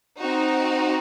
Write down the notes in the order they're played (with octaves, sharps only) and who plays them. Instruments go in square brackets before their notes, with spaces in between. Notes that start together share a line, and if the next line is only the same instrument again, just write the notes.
[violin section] C4 D#4 F#4